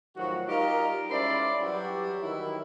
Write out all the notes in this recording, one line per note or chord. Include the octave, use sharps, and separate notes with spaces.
A2 D#3 F3 F#3 F#4
G3 D#4 F4 G4 A#4 D#5
G#2 C#4 E4 C5 D5 B5
E3 F#3 G3 E4 F#4 G4
D#3 E3 F#3 E4